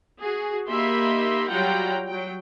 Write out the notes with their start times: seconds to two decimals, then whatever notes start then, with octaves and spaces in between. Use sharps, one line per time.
0.20 F#4 G#4
0.68 A#3 D#4 G4 E5 B5 C6
1.49 F#3 G3 F4 F#5 G5 A#5
2.08 F#3 G5